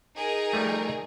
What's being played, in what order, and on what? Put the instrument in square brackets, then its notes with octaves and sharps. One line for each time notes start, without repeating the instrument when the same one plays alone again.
[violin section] D#4 G#4 A#4
[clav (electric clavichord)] F3 G3 A3